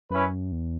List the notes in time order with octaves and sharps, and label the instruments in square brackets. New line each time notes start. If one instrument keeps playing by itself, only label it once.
[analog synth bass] F#2 [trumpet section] C#4 E4 B4
[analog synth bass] E2